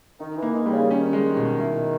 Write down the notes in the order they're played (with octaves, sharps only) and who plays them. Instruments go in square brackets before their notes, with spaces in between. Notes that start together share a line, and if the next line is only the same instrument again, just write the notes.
[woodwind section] D#3 [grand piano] D#4
[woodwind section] E3
[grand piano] A#3
[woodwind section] G#3
[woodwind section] D#3 [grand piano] G3
[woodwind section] C#3
[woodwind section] D#3 [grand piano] C#4
[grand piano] G#3
B2
E4